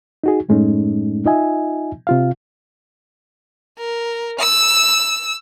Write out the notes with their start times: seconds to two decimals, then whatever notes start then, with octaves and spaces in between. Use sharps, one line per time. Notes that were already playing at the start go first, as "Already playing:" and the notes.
0.24 D#4 F#4 G#4
0.49 F#2 A2 G#3 A3 C#4 D#4
1.25 D#4 F4 D#5 E5 G#5
2.07 C3 F4 F5
3.78 A#4
4.40 E6